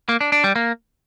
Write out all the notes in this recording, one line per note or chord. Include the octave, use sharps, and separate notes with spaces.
A#3
D4
D4
G3
A#3